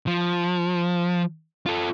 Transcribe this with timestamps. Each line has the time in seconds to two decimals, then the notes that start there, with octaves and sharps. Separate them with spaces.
0.07 F3
1.66 F4 A4